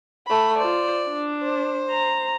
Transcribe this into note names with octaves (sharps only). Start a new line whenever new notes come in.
A3 B5
F4 C5 D5
D4
C5
A#5